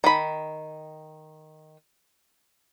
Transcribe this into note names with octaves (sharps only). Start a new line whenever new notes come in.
D#3 B5